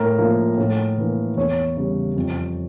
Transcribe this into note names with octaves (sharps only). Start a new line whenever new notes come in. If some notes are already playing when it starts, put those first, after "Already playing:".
Already playing: A2 A#4
F3 A#3
A2
E3 A#3
E2 C#5
C#3 G3
F2